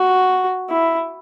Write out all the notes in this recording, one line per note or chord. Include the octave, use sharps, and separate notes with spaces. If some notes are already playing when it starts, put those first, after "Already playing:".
Already playing: F#4
E4